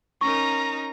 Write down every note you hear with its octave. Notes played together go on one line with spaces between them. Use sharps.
C#4 D#4 A#4 A#5 C#6